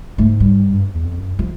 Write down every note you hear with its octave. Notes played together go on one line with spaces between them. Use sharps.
G#2 A3
G3
G2
G2
E2
F2
F#2
F3